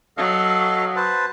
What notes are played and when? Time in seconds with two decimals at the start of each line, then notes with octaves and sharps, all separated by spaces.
0.17 F#3 A4 D#5 F5
0.96 B4 C5 A5